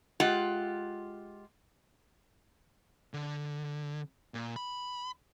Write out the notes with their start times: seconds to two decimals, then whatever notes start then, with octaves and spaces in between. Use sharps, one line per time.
0.20 G#3 F4 G4 F#5
3.14 D3
4.34 A#2
4.56 B5